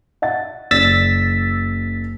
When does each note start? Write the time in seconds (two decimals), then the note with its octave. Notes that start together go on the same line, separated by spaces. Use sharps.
0.22 D#5 F#5 A6
0.71 F#1 D5 E6 A6 B6